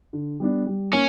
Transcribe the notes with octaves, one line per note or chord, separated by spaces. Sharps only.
D3
G3 B3 D4
G3
A#3 C#4